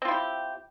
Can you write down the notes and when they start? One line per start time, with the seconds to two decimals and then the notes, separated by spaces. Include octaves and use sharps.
0.02 C4
0.05 F4
0.08 E4
0.11 G4